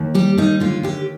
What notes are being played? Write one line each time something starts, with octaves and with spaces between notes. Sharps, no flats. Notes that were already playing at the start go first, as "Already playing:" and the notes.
Already playing: D#2
G3 G4
D#2 D#4
D3 F4
D#2 G4